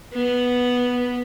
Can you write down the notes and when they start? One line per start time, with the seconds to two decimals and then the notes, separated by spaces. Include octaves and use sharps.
0.14 B3